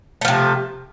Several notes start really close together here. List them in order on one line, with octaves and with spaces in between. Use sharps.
A3 F3 C3